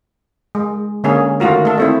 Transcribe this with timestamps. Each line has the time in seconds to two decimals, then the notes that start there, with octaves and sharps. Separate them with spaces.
0.55 G#3
1.04 D3 G#3 A#3 C#4 G#4
1.40 D#3 A3 F4 F#4 A#4
1.65 A3 A4
1.78 A3 C4 E4